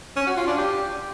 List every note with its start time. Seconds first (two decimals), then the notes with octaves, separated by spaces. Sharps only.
0.17 C#4
0.27 F#4
0.37 F4
0.47 D4
0.58 G4